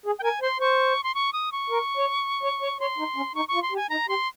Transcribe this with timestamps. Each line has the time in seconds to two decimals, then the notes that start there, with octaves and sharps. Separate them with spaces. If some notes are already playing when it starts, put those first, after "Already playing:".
0.06 G#4
0.19 G5
0.23 A#4 G#5
0.42 C5 C6
0.60 C5 C#6
1.04 C6
1.15 C#6
1.33 D#6
1.52 C#6
1.70 A#4
1.97 C#5
2.43 C#5
2.62 C#5
2.80 C#5 C6
2.98 D#4
3.16 C#4
3.35 D#4 C#6
3.48 C#6
3.54 F4
3.62 C6
3.72 G4
3.76 G#5
3.89 D#4 A#5
4.09 G4 C6